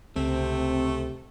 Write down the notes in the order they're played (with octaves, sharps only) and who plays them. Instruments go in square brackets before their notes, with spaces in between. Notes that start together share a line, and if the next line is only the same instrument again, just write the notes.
[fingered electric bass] C#2 [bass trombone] C3 [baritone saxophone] A3 [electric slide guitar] C4